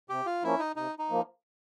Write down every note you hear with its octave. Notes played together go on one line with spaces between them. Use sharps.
C3 G4
F4
F3 A#3 C#4 E4
D#4
C3 D#4
D#4
F3 A#3